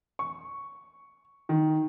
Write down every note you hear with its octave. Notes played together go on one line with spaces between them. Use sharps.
C#6
D#3